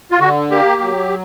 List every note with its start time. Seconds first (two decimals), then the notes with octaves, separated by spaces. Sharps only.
0.11 F4
0.20 D3 F#4
0.51 A#3 G4
0.81 F#3